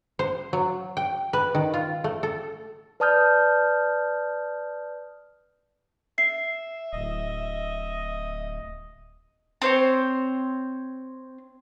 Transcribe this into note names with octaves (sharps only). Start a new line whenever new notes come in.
C5
F#3
G5
B4
D#3
F4
A3
A4
B4 D5 A5 D#6 F6 G6
E5 C7
D1 D#5
C4 C5 C#5